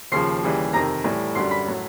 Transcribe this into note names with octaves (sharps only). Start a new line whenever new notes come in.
D#2 C#3 F3 C6 C7
D#2 C#3 E3 G3
F2 C3 D#3 A#5 A#6
A2 E3 G3
F#2 D3 G3 C6 C7
B5 B6
A2 F#3